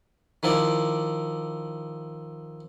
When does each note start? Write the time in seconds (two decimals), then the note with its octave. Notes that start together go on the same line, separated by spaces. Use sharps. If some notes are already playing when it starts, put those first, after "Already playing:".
0.43 D#3 F3 E4 D5